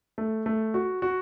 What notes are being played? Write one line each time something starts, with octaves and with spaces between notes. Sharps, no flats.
A3
A3
F#4
F#4